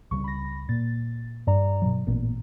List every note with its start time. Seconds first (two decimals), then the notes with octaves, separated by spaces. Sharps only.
0.11 C#2 C#3 G3 C#6
0.24 B5 A#6
0.69 A#2 A6
1.47 G2 D5 A#5
1.82 B2 F#3
2.07 A1 A#2 B3